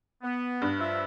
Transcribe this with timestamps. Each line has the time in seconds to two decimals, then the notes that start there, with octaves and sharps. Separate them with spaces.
0.23 B3
0.62 G2
0.79 F3 F4 E5